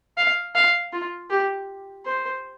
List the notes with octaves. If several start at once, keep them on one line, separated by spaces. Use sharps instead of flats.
F5
F5
F4
G4
C5